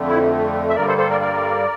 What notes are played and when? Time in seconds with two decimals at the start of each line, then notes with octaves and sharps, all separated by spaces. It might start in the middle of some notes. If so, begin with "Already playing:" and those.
Already playing: F2 D3 A3
0.08 E4
0.69 E5
0.75 G2 D3 G3 A#3 A#4 D5
0.88 A4 C5
0.98 A4 C5
1.09 A#4 D5
1.21 A#4 D5